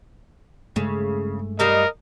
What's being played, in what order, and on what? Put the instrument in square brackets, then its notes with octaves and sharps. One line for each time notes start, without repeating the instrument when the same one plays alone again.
[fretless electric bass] G2 G#3 A3 [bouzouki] C#3
[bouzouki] G3 D#4 F5 [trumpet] A#4 [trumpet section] D#5